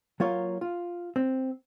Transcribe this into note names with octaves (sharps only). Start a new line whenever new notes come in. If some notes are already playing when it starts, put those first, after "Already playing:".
F#3 A#3 F4 C#5
F4
C4